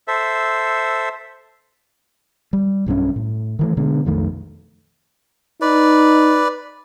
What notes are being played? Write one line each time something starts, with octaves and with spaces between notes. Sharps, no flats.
A4 C5 E5
G3
B1 G2 C4 C#4
A2
D#3 E3 A3
B2 D3 G#3
B1 F2 D#3 A3
D#4 B4 D5